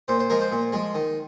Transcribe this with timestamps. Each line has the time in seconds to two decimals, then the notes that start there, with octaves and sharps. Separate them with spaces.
0.08 A#2 C5
0.19 C5
0.30 F3 G#3 A#4
0.41 C5
0.52 A#2
0.72 F3 G#3
0.95 D#3